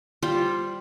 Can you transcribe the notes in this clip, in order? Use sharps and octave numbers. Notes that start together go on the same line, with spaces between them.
G3 F4 C5 G5